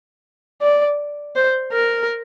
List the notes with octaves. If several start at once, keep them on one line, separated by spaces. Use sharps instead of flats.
D5
C5
A#4